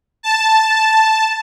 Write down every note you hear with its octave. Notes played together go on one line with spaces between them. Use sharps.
A5